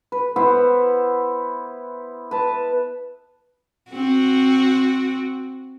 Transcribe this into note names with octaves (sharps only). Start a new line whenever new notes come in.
B4
B3 E4 C5 F#5
B4 A5
C4 F#4